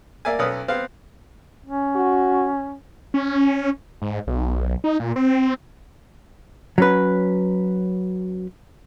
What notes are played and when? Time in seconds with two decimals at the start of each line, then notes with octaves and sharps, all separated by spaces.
0.25 A#3 D5 E5 G#5
0.39 B1 C#4 A4 B4 D#6 F6
0.68 B3 C4 F5
1.66 C#4
1.95 F#4
3.14 C#4
4.02 G#2
4.27 B1
4.84 D#4
5.00 A#2
5.16 C4
6.78 F#3 C#4 B4